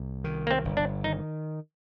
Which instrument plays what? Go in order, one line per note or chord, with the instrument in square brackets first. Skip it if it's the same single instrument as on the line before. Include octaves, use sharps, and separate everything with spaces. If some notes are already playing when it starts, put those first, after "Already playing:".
Already playing: [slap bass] C2
D#3
[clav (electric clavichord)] A#3
C4
[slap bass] G1
[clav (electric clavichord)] D4
[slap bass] D#3 [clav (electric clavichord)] D#4